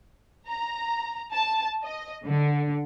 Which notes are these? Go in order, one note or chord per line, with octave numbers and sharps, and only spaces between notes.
A#5
A5
D#5
D3